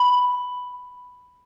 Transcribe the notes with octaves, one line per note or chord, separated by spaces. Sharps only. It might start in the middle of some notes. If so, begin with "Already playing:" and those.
Already playing: B5